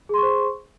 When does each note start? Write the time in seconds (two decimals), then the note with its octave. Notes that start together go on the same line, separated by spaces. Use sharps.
0.09 G#4
0.14 C6
0.18 C#6
0.23 C5